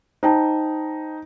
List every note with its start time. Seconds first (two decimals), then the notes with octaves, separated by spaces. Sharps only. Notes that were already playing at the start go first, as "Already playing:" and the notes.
0.23 D#4 C5 G5 A5